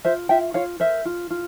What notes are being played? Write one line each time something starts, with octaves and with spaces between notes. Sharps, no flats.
F4 C5 E5
F4 E5 G5
F4 C#5 F5
A#4 C5 E5
F4
F4